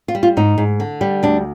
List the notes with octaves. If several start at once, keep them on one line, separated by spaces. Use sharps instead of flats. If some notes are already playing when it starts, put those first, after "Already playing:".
F4
G3
F4
G#2 D#4
G#2
D3
G3
D2 D4